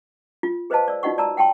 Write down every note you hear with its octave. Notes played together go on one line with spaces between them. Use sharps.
F4
G#4 B4 C5 D#5 F5 A5
D5 E6
D#4 F4 F#4 D#5 F#5 C#6
D5 A5 A#5 E6
F#5 G5 A5 C6